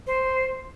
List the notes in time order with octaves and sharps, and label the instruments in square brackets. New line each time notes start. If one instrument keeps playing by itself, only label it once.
[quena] C5